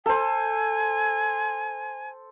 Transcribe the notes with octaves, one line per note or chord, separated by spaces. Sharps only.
A4 C5 G#5